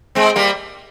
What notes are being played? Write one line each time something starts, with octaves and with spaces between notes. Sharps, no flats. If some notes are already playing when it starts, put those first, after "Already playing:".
G#3 C4
G3 A#3